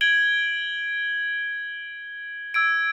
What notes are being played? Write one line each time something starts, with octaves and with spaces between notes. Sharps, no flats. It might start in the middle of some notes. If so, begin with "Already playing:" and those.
G#6 D7 F#7 G7
E6 G#6 D7